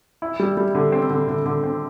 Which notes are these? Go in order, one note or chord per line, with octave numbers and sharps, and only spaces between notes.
E4
G3
G3
D3
C4
D3
D3
D3
C4